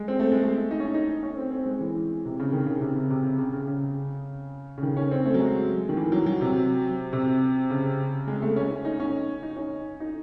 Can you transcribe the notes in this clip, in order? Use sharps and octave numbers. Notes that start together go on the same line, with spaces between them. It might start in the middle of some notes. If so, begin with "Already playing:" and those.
Already playing: G#3
C4
A3
G#3
A3
D#4
C#4
D#4
C#4
C4
C4
G#3
E3
C3
C#3
D#3
C#3
C3
C#3
C3
C#3
C#3
C#3
C#3
C#3
D#3
C#4
C4
A3
F#3
G#3
D#3
E3
F#3
F#3
C3
C3
C#3
G#3
A3
C#4
C#4
D#4
C#4
D#4
C#4
D#4